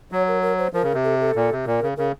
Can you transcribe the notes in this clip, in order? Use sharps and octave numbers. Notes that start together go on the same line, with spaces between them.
F#3 C#5
A#4
A#4
C5
F3 A#4
C#3
C3
A4
A4
A#2
C3
A#2 A#4
C#3
C#3 A#4